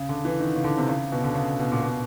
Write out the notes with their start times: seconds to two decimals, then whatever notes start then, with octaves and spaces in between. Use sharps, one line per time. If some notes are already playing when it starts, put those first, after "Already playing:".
Already playing: C#3
0.09 D3
0.25 E3
0.40 D#3
0.56 C#3
0.64 D3
0.78 C3
0.89 C#3
1.12 B2
1.24 D3
1.35 C#3
1.59 B2
1.72 A#2
1.83 B2